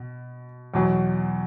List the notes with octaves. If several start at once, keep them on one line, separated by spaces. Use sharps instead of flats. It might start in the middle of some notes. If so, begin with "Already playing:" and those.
Already playing: B2
E2 B2 F#3